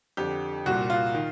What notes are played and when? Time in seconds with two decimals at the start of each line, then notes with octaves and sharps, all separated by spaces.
0.17 F2 D3 G4
0.66 C2 A#2 F#4
0.90 F4
1.14 D#3